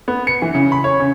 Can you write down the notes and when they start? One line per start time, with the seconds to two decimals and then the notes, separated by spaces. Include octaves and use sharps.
0.08 B3
0.27 C#7
0.42 E3
0.55 C#3
0.72 B5
0.84 C#5
1.00 C#3